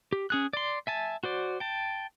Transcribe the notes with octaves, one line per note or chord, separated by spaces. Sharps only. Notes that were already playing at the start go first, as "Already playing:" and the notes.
G4
C#4 G#4 F#6
D5 C6
E5 G#5 A5
F#4 C5 D5
G5 A5